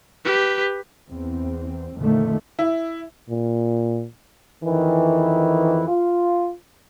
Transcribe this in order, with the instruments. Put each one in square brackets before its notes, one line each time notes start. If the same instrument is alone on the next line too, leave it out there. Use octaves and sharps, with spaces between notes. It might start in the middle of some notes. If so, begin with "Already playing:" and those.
[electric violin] G4 B4
[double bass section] E2 C4
F2 A#2 D3 D#3 A3
[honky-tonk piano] E4
[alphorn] A#2
[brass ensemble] F2 D#3 E3
F4